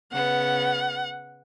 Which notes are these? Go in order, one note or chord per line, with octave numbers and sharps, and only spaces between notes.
C#3 B3 F#5